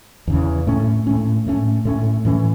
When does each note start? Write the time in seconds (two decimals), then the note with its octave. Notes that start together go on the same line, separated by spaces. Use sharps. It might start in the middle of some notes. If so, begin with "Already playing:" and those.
0.27 E2 C#3 E3
0.67 A2 A3 C#4
1.07 A2 A3 C#4
1.46 A2 A3 C#4
1.85 A2 A3 C#4
2.25 A2 E3 C#4